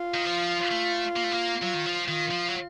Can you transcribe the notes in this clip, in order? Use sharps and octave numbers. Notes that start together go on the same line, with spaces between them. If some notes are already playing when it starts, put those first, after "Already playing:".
Already playing: F4
D#3
F3
A3
A#3
A3
A#3
F#3 F4
D#3
F3
D#3 F4
F3
F#3